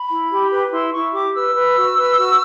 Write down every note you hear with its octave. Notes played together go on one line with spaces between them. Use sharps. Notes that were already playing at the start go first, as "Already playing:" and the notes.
Already playing: B5
E4
G4
B4
E4 C6
E4 C#6
G4 D6
B4 E6
B4
F#4
B4
F#4